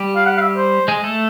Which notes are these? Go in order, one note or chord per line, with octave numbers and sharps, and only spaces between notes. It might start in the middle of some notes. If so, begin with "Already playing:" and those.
Already playing: G3 G4
F5
F#5
F5
E5
C5
G#3 G#4
A3 A4